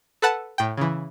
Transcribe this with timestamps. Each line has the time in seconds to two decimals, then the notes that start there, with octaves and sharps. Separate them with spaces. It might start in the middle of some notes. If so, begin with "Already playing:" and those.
0.22 A4 B4 F#5 A5
0.58 A2 G5
0.77 C#3 E3